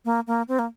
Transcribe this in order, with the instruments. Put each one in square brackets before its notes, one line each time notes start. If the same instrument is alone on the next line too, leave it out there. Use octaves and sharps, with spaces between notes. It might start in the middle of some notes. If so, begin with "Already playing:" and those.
[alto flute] A#3
A#3
C4
A#3